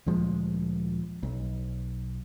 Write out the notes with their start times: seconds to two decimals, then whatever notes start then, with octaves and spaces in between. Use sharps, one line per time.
0.06 D2 A#2 F3 G#3
1.23 B1